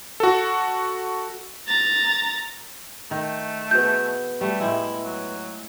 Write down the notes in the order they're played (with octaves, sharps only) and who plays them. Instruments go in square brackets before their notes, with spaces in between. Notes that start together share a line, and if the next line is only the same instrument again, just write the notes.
[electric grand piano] F#4 A4
[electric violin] A#5 A6
[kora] D#3 [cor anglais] A3
[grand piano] B3 F#4 G#4 [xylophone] G6
[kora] G3 [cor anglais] A3
[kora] A2 G#3 [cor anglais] E4
[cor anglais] F#3